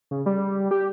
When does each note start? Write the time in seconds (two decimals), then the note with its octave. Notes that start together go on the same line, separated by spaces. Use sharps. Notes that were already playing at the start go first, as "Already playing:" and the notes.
0.11 C#3
0.26 G3
0.71 G4